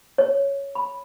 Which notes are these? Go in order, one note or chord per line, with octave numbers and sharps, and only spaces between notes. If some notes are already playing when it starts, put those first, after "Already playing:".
C#5
B5